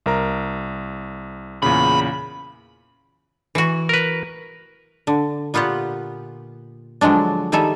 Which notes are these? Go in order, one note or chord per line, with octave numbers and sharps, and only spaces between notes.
C2 A#4 A#5
E2 A#2 C#3 B5
E3 F#4
A#4 B4
D3
A#2 B3 F4 G4 F#5
D3 F3 F#3 G#3 D4
D#3 G3 G#4 A4 E5